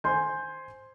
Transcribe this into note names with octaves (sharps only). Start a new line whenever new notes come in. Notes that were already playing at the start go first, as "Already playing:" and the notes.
C5 G#5 C6 G6